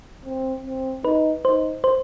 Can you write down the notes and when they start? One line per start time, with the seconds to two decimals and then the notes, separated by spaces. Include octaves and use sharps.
0.25 C4
0.66 C4
1.05 D#4 B4
1.45 D#4 C5
1.84 C5